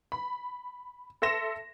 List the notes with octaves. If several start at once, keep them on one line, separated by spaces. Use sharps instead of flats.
B5
A4 E5 C6 A#6 E7